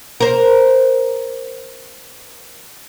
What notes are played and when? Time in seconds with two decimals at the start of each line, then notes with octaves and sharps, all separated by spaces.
0.20 A#4 C5